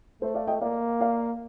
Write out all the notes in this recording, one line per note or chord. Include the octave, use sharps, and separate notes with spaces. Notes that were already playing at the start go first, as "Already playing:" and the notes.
A3 A4 C5
D5 F5
D#5 G5
A#3 D5 F5
D5 F5